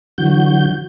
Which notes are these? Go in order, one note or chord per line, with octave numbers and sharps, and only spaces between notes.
D3 E3 F#3 F#4 G6